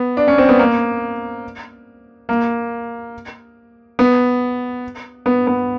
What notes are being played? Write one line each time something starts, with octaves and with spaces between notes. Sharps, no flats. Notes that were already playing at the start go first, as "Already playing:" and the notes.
Already playing: B3
D4
C#4
C4
B3
A#3
A#3
B3
B3
B3